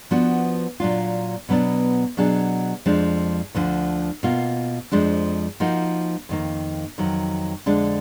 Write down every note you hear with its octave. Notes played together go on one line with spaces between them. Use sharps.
F3 B3 D4 F#4
A#2 F#3 D4 F4
B2 F#3 B3 D4
B2 F#3 D4 G#4
F2 F3 G#3 D4
D2 D3 F3
B2 A#3 F4
F2 F3 G#3 D4
F3 A#3 D#4 F#4
F2 D#3 A#3
F2 D#3 F#3
F2 D3 G#3 D4